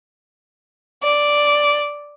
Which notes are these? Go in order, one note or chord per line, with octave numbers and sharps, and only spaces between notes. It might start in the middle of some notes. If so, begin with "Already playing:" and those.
D5